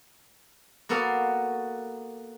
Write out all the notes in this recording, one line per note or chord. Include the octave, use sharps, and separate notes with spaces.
A#3 B3 F#4 A4 F5